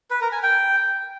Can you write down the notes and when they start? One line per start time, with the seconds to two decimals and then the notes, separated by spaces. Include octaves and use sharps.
0.10 B4
0.21 A#4
0.32 G#5
0.43 G5